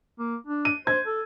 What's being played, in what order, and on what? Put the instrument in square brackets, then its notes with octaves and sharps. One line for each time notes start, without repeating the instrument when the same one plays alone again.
[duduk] A#3
D4
[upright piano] D#7
[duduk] C5 [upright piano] G#6
[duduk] A4